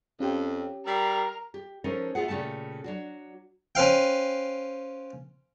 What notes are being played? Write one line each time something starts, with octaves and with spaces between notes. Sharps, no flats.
F2 C#4 G4 G5
G3 A#4 E6 B6 C7
G4
F3 G#3 C#4 D#4 A4 A#4
A3 B3 F4 F#4 G#4 F#5
A#2 C#3 A3 G4 A5
F#3 D4 F#4
C#4 B4 C5 F5 G5